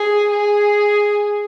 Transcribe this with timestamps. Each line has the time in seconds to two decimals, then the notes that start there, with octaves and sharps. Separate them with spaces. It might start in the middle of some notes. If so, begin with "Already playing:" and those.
Already playing: G#4
0.30 G#4